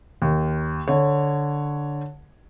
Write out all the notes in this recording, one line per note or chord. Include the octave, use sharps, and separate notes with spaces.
D#2
D3 C#5